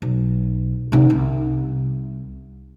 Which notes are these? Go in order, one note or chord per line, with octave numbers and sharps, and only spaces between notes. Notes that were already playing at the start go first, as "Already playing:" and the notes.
B1
C3 D#4
C2